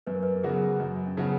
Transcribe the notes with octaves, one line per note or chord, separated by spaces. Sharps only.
F#2 B4
A#4
B4
A#4
C#3 F#3 B3 F#4 G#4
F#2
C#4
C#3 F#3 B3 D#4 F#4